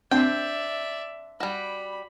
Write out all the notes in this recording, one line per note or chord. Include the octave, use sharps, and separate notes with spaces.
C4 D4 D5 E5 G5
G3 F#4 B5